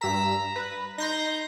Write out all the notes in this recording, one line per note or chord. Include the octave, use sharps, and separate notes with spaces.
G2 A#5 E6 B6
B4
D#4 C6 G6 A#6